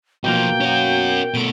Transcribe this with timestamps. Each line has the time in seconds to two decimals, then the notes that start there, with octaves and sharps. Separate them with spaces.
0.24 B1 B2 F3 A#3 G5
0.61 C#4 F#4
1.34 B2 A3 D7